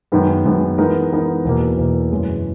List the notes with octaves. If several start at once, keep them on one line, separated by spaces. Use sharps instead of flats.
F#2 D#3 G#3 B3
F#2 D#3 G#3 B3
E3 G#3 B3 D#4 A#4
E3 G#3 B3 D#4 A#4
E2 B2 A#3
E2 B2 A#3
F#2 E3 G#3 C#4